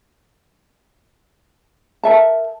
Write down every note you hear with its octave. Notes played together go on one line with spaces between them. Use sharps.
A#4 E5 A5